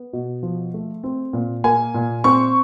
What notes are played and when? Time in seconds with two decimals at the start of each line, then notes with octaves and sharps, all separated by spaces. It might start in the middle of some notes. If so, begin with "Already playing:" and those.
Already playing: B3
0.13 B2
0.43 F3
0.74 A3
1.03 C4
1.33 A#2
1.64 A#3 G#5
1.94 A#2
2.24 C4 C#6